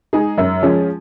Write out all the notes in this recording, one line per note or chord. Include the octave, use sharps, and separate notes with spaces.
G#3 D#4 G#4
F#2
F3 G#3 C#4 G#4